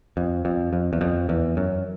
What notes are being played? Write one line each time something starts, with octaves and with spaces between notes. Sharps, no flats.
F2
F2
F2
E2
F2
E2
F#2